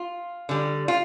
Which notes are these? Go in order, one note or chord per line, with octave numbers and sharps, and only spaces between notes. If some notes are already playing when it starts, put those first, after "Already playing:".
Already playing: F4
D3 G3
F4